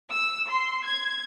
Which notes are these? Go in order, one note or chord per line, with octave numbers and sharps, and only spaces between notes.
E6
C6
G#6